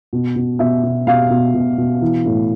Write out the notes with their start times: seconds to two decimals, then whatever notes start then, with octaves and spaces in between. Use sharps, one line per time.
0.13 B2
0.36 B2
0.59 B2 E5
0.83 B2
1.07 B2 F5
1.31 B2
1.54 B2
1.78 B2
2.02 E3
2.25 A2